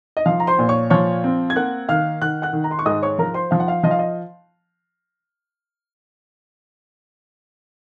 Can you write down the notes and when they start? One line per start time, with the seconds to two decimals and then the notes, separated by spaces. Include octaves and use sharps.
0.17 D#5
0.26 F3 F5
0.40 A#5
0.47 C5 C6
0.59 A#2
0.69 C#5 C#6
0.90 F3 C#5 C#6
1.24 C4
1.50 G#6
1.56 A#3 F#5 F#6
1.89 D#3 F5 F6
2.22 D#3 F#5 F#6
2.42 F#5 F#6
2.53 D#3
2.64 A#5
2.71 C6
2.79 C#6
2.85 G#2 D#5 D#6
3.02 C#5 C#6
3.18 F3 A#4 A#5
3.34 C5 C6
3.51 F3 F5
3.60 F#5
3.68 F5
3.83 F3 D#5
3.91 F5
3.99 D#5